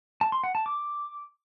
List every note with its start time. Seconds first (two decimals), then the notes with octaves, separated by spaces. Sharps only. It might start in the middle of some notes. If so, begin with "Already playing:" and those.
0.21 A5
0.32 C6
0.44 F#5
0.55 A5
0.66 D6